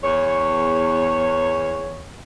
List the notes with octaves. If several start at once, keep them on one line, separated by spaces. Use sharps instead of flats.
E2 C#5